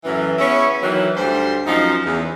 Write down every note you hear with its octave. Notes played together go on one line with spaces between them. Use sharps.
F#2 A2 E3
B3 C#4 E4 G#4 C#5
D#3 E3 F#3
D2 G3 C5
F#2 F3 D#4
E2